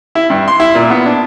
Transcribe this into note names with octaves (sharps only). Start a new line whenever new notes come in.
E4
G2
C6
E4
A#2
B3
D4